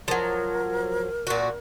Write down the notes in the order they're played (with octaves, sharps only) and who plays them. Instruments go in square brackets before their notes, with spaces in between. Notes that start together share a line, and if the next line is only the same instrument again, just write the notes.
[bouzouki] F3 F#3 [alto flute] A#4
[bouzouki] A#2 F#4